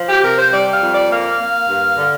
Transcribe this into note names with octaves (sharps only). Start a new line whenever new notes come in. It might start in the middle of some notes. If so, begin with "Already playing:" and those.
Already playing: F3
G4
C3 A#4
C5
G3 D5
F5
F2
D5
A#3 F5
A#3
G2
D3